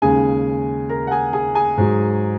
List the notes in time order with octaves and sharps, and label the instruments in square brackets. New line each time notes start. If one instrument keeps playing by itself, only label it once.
[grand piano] D#2 C#3 G#3 G#4 G#5
A#4 A#5
F#5
G#4 G#5
G#4 G#5
G#4 G#5
G#2 F#3